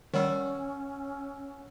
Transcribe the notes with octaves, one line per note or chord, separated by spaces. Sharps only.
D#3 G3 C#4 C#5 F#5 E6